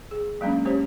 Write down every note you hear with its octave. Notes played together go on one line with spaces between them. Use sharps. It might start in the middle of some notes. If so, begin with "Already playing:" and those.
G#4
F#3 G#3 A#3 C#4 D4
C#4 G4 C5 C#5